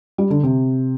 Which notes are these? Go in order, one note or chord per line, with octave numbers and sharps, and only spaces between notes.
G3
D3
C3